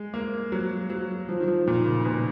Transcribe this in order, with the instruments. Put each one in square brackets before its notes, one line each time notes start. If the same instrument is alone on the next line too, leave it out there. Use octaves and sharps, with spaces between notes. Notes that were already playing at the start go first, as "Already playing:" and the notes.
Already playing: [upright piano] G#3
A#3
F#3
F#3
F3
D#3
F3
A#2
D#3
C#3
B2